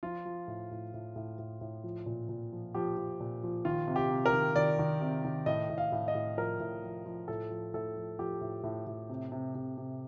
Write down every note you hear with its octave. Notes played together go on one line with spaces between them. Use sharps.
F3 F4
F3
A2
A2
A2
A2
A2
A2
F3
A#2
A#2
F3
F3 G4
F3
A#2
F3
D#3 F4
C3
G4
C3
A#4
D#3
D#3 D5
D#3
C3
D#3
A2 D#5
A2
F5
A2
D#5
A2
F3 A#4
A2
F3
F3
A2 A4
F3
A2 A4
F3
F3 G4
A2
A2
A2
C3
C3
C3
C3